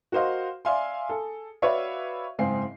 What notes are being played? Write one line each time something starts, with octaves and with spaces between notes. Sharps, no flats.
F#4 A#4 C5 D#5 F5
D5 E5 F5 G#5 C6
G#4 A4
F#4 B4 C#5 D5 E5 F5
F#1 G#2 C4 G#4 F5 C7